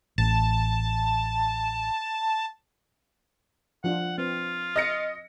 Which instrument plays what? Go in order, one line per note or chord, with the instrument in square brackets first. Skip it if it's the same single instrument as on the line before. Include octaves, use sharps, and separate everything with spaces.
[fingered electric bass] A1 [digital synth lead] A5
[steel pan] F3 D4 F4 [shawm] F#5
[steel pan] C4 B4 [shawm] F4
[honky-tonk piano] D#5 A#6 C#7